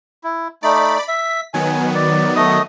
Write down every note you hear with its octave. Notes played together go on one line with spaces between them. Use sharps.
E4
A3 D#4 D5 B5
E5 B6
D#3 F#3 B3 G#5
D5
A3 D#5 D#6